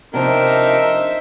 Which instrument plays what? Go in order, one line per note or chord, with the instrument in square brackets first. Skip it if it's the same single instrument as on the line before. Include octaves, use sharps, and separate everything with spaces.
[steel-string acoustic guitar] C3 F3 [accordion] D4 A#4 [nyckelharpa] D#4 E5 [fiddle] C5